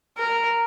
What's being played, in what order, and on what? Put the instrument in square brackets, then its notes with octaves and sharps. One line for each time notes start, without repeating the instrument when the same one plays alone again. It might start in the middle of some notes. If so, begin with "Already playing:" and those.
[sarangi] A#4